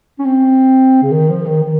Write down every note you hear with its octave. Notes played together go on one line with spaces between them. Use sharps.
C#4
C4
C#3
D#3
F3
D#3
D#3